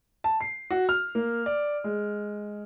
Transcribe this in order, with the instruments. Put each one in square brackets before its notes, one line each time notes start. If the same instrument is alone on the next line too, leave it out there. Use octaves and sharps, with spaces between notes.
[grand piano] A5
C7
F#4
F6
A#3
D5
G#3